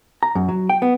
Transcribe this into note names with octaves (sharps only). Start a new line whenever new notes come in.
A#5
F#2
F#3
G5
B3